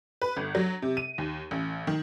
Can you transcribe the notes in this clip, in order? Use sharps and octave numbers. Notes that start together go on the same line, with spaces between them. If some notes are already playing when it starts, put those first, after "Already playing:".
B4
G1
F#3
C3
D#7
D#2
A1
D#3